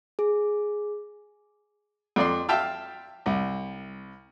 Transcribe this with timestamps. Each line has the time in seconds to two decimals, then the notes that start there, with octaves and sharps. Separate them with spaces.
0.19 G#4
2.16 F2 D5 C6
2.49 E5 F5 G5 A5 F6
3.26 C2